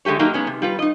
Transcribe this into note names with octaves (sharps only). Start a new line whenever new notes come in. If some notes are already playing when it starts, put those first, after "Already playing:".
D3 G#3 A3 G4 C#5
F#3 A#3 D#4 G4 A#4
G#3 B3 C#4 D#4
C3
G3 F4 B4
D#4 D#5